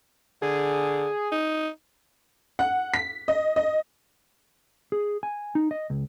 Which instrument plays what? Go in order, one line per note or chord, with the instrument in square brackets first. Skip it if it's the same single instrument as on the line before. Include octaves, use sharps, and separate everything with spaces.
[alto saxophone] D3 [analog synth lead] G#4
[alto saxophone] D#4
[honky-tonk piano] F#5
B6
D#5
D#5
[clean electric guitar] G#4
G#5
D#4
D#5
C#2